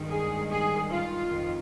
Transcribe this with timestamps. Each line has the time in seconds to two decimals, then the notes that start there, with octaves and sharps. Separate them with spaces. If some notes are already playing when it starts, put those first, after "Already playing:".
Already playing: G2 D#3 G#3
0.10 G#4
0.50 G#4
0.90 F4
1.30 F2 D#3